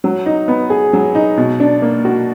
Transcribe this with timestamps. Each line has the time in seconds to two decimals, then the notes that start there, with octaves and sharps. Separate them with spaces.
0.04 F#3
0.26 D#4
0.48 B3
0.70 G#4
0.93 F#3
1.15 D#4
1.38 B2
1.60 D4
1.82 A#3
2.05 F#4